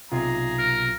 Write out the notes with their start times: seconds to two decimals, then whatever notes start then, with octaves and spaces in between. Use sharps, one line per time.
0.12 B1 C3 F4 G#4 A#5
0.58 A#4